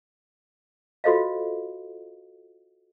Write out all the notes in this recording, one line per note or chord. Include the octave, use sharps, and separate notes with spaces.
F4 F#4 A4 C5 D#5 F5